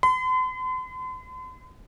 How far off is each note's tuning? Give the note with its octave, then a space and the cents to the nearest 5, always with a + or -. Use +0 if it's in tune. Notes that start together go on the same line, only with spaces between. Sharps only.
C6 -45